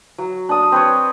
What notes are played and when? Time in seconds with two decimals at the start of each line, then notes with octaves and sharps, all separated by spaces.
0.18 F#3
0.49 D4 D#6
0.72 C4 B4 C#5